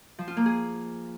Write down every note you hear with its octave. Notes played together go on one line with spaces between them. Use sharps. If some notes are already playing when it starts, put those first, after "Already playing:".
F3
F4
A#3
G#4